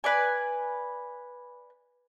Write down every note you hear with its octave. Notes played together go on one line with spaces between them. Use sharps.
B4 D5 G#5